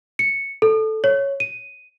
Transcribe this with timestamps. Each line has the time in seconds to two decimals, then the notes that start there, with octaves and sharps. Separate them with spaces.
0.19 C#7
0.62 A4
1.04 C#5
1.40 D#7